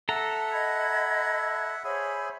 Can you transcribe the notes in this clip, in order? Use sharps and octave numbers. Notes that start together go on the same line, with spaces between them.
A4 E5 F#5 A#5
D#5 B5 G#6
G#4 C5 C#5 E5 G#5 B5